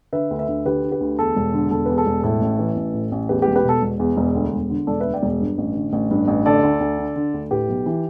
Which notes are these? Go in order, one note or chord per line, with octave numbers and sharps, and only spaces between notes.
D3 B4 E5
D2
B4 E5
D2
D3 G4 B4
D3
G4 B4
D2
E2 A4
E1
D3
E1 A4
E2 B4
A4
E1
A2 A4
A1
E3
A1
A2
A1
E2 G4 B4
G4 B4
E1
G4 B4
B2 A4
E1
E2
E1
D2
E1
D3
E1 A4 D5
D2 B4 E5
D5 G5
E1
G2
A1
D3
A1
G2
A1
D3 A4 D5
D2
D2
D3
D3
D2
A2 G4 B4
B1
E3